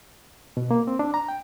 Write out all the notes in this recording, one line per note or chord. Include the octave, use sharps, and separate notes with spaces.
B2
A#3
C4
D4
A#5
G5